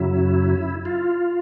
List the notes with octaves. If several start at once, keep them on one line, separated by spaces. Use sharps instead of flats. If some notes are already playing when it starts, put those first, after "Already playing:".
Already playing: F#2 C#3 F#3 E4
F4